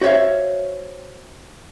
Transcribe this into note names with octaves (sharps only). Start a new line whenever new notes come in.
F#4 C5 C#5 E5 F5